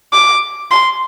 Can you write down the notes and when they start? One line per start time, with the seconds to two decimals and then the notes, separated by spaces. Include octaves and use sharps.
0.13 D6
0.71 C6